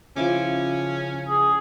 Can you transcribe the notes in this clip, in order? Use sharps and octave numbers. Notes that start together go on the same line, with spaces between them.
C#3 F3 C#4 E4 D6
G#4